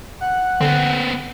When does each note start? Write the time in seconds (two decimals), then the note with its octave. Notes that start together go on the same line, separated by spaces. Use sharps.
0.21 F#5
0.61 D3 B3 C4